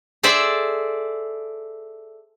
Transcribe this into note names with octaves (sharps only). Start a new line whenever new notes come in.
G#4 A4 C5 D5 E5